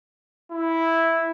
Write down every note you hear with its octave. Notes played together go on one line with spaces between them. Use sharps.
E4